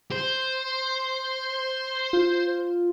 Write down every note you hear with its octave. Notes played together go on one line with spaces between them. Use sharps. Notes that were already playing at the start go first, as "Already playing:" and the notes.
C5
F4